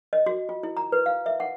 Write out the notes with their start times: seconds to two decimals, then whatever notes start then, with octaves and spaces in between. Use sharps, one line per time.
0.13 D#5
0.26 F#4
0.49 F4
0.63 E4
0.77 A#5
0.92 B4
1.06 F5
1.26 E5
1.40 F#5